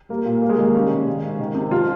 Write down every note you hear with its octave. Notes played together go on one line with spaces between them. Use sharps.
G3 A#3
A#2
G3 A#3
G#3
D#3 A#3
G3 C#4
C#3
D#3
G#2
D#3
C3
F3 F4